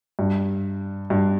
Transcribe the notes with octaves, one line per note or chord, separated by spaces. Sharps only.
G2
G2